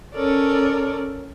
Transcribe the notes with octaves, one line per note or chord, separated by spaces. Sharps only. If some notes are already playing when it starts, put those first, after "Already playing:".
C#4 A4 A#4 C#5 D5